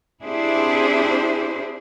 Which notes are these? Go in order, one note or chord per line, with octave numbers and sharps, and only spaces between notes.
C4 D4 E4 G4 G#4 C5